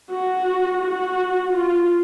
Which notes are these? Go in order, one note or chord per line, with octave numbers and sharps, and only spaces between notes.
F#4
F#4
F4